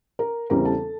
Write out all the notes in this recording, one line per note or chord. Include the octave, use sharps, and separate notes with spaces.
A#4 A#5
E2 C#3 E3 G3 C4 A#4 A#5
A4 A5